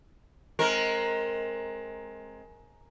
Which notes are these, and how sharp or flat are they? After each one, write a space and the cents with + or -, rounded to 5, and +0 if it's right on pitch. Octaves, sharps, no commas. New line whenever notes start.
G#3 +20 C4 +25 A#4 +0